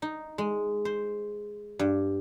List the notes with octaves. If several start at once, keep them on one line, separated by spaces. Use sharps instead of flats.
D#4
G#3
C5
G2